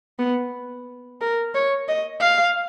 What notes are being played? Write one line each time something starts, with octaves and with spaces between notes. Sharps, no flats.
B3
A#4
C#5
D#5
F5